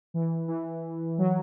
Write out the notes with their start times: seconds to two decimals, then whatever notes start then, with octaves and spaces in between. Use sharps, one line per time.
0.14 E3
0.48 E3
1.18 F#3